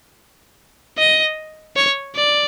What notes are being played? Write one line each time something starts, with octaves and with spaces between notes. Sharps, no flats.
D#5
C#5
D5